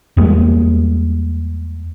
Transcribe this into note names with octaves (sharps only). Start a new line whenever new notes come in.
E2 G3 G#3 A#3